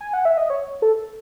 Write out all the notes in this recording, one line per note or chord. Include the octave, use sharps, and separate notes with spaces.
G#5
F#5
E5
D#5
C#5
A4